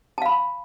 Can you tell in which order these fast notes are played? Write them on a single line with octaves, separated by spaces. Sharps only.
A5 F5 B5